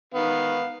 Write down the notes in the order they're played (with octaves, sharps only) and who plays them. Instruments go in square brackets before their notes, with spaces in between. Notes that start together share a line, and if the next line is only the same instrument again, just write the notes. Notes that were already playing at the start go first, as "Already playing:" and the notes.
[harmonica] D#3 B3 F5